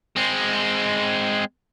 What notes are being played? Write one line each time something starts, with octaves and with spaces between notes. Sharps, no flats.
G#3 C4